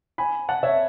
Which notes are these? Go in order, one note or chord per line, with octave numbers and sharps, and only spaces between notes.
G#5 B5
F#5 A5
C#5 E5